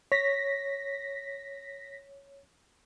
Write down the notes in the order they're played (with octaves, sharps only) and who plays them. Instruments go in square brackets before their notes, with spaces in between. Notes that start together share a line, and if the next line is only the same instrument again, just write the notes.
[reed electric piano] C#5 [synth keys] A#6 B6